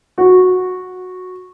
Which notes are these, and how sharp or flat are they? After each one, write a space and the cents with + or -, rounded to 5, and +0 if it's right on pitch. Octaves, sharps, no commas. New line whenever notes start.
F#4 -10